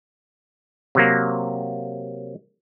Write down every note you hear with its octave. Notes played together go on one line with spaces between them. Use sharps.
C3 F#3 A#3